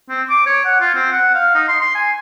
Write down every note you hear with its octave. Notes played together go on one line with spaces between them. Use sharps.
C4
D6
C#5
F#5
F4
C4
F#5
F5
D#4
C6
C6
G#5